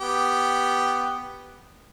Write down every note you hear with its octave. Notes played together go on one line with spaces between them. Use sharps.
B3 G4